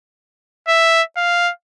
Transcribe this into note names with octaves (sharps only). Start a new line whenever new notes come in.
E5
F5